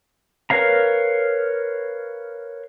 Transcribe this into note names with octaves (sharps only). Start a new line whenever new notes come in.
A#4 B4 C#5 F5 A#5